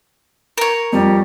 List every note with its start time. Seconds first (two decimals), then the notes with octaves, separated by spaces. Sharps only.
0.58 A#4 C#5
0.93 F2 G3